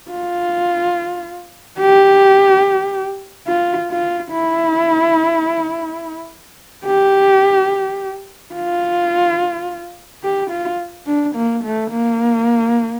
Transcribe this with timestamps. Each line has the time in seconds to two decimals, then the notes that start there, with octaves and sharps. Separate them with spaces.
0.11 F4
1.80 G4
3.47 F4
3.91 F4
4.32 E4
6.85 G4
8.55 F4
10.23 G4
10.50 F4
11.06 D4
11.35 A#3
11.64 A3
11.91 A#3